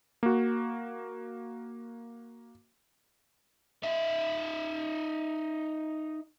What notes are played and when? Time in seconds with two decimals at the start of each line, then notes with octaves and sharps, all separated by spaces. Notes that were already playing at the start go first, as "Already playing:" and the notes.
0.23 A#3 F#4
3.83 D#4 E5